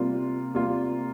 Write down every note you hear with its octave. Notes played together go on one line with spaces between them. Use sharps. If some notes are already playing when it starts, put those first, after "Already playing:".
Already playing: C3 G3 A#3 F4
C3 G3 A#3 F4